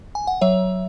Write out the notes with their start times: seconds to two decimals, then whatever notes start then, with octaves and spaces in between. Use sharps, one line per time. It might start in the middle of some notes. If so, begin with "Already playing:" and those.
0.15 G#5
0.27 F#5
0.41 F#3 C#5 E5